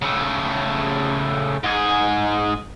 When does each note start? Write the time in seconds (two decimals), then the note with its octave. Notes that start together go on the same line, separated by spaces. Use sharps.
0.02 C#3 A3
1.63 G#2 G#4